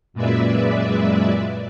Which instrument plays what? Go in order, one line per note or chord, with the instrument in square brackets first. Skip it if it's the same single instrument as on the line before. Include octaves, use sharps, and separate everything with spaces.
[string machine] F#2 A#2 G#3 B4 D5 E5